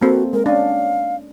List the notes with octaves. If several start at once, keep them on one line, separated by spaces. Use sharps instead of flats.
A#3 C4 F#4 A4
G#3 A#4
C#4 D4 F5